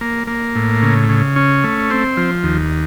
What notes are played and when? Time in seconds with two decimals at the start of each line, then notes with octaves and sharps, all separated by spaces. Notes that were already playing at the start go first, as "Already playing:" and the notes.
0.01 A#3
0.27 A#3
0.55 A2
0.82 C#3
1.09 C#3
1.36 C#4
1.64 A3
1.90 C4
2.17 F3
2.44 D#2